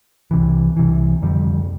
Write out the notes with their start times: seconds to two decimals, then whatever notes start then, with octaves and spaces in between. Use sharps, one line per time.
0.31 C2 C3 E3
0.76 C2 C3 E3
1.22 F2 D3 G3